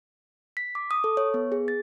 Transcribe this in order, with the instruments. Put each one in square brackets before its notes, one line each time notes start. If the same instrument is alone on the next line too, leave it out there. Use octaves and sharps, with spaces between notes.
[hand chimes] B6
D6
D#6
A4
C#5
B3
G#4
A6